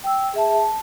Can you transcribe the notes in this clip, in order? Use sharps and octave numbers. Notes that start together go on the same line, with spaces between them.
G5 E6
G#4 E5 A5
A5